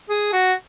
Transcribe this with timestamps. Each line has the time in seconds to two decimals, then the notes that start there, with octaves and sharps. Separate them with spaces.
0.09 G#4
0.33 F#4